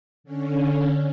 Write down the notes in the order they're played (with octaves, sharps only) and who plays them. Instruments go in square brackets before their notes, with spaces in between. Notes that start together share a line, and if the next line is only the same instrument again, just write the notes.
[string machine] D3 C#4